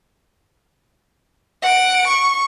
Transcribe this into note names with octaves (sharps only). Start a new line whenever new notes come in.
F#5 D7
C#6